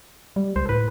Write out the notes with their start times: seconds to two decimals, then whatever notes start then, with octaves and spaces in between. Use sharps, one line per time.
0.36 G3
0.56 C#2 C5
0.69 A2 B4